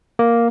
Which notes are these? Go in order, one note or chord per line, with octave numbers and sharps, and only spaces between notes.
A#3